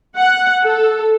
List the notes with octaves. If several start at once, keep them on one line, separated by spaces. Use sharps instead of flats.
F#5
A4